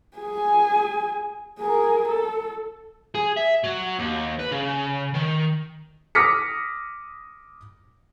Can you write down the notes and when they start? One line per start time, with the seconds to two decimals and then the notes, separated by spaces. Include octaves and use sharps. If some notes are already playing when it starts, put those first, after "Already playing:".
0.17 G#4 G#5
1.59 G#4 A#4
2.08 A4
3.15 G#4
3.37 E5
3.64 F#3
3.99 D#2
4.39 B4
4.52 C#3
5.14 D#3
6.15 D6 D#6 F6 A#6 B6 C#7